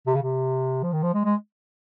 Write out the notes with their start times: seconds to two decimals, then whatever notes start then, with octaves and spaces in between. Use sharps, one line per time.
0.07 C3
0.15 C#3
0.22 C3
0.83 F3
0.93 D#3
1.03 F3
1.14 G#3
1.25 G#3